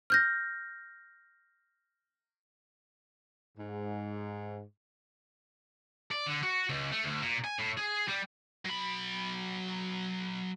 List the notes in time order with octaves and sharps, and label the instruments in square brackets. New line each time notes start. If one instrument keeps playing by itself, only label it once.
[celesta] F6 G6 A#6
[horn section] G#2
[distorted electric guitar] D5
D3
F#4
C#2
A3
D2
A#2
G#5
A2
G#4
G3
F#3 B5